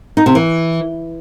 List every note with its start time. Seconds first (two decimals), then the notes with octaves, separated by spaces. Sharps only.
0.17 D#4
0.26 C3
0.35 E3